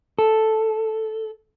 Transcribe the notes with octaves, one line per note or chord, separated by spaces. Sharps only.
A4